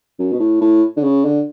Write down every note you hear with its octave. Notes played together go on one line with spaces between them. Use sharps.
F#2
B2
A2
A2
D3
C#3
D3